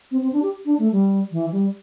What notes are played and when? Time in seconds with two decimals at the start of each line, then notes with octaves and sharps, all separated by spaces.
0.11 C4
0.21 C4
0.33 D4
0.42 G4
0.65 D4
0.79 A3
0.92 G3
1.32 E3
1.52 G3